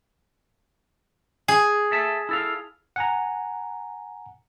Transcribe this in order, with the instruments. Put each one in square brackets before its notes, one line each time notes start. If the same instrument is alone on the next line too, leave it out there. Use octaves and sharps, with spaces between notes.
[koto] G#4
[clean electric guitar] A4 E5 A5
E4 A4 F5
[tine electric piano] F#5 G#5 A#5